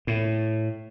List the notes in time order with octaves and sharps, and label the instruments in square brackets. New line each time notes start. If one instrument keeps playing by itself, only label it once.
[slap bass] A2